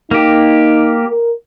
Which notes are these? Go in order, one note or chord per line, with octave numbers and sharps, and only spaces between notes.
A#3 D#4 G4
A#4